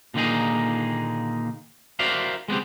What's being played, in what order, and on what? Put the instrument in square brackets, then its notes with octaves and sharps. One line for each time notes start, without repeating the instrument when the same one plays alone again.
[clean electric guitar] A#2 D3 D#3 A#3 D#4 G#4
F#4 A#4 C5 D5 E5 F5
G#3 B3 C4 G4